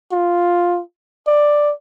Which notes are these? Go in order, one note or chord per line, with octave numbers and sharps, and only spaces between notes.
F4
D5